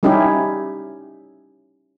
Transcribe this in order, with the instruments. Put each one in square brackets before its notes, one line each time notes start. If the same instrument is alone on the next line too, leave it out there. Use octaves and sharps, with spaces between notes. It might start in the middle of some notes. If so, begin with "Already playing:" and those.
[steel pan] G3 C#4 D#4 E4 G4